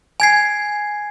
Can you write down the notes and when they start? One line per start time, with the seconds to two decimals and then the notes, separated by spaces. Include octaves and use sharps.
0.20 G#5 G#6 C7